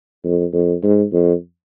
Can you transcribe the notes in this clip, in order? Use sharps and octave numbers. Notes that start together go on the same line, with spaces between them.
F2
F2
G#2
F2